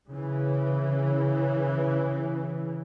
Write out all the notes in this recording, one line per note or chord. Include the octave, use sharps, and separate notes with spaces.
C#3 E3